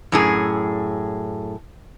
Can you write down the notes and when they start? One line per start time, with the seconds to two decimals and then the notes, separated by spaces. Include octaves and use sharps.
0.12 F#2 A2 G#4